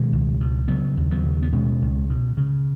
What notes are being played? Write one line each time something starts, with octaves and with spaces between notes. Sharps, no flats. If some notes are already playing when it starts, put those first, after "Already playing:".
Already playing: B2 D#3 G#3
C#2
B2
C#3 F#3 B3
D#2
F#3 B3
C#3
B3
B2 G#3 C#4
C#2
B2
C#3